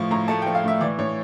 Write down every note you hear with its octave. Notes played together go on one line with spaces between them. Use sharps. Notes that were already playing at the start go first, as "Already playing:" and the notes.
Already playing: A2 F3 C#6
A2 A#5
A3 A5
G5
F3
F5
A2 E5
E3 D5
A2 C#5